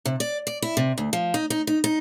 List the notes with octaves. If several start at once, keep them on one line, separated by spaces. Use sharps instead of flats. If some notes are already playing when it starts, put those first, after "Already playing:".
C3
D5
D5
E4
C3
D2
F3
D#4
D#4
D#4
D#4